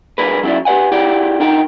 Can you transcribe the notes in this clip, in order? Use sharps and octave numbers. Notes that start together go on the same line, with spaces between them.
G2 D4 G#4 A#4 B4
F#3 C#4 E4 G#4 D5 E5
G4 B4 D5 F#5 G#5
E4 G4 G#4 D5 F#5 G5
D3 D#4 A#4 F#5 G5